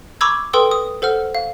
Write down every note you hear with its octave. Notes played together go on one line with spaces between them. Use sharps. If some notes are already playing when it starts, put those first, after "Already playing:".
A#5 B5 C#6 D6 E6 G#6
A4 B4 G5 C6 D#6 E6
D#6
A4 C5 F#5 F6
F5